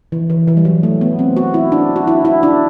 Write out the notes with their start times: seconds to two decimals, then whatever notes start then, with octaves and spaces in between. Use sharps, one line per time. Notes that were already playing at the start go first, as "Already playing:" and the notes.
0.12 E3
0.30 E3
0.48 E3
0.57 G3
0.65 F#3
0.83 A3
1.01 B3
1.19 C4
1.37 F#4
1.54 E4
1.72 D4
1.96 F#4
2.08 E4
2.25 E4
2.43 D4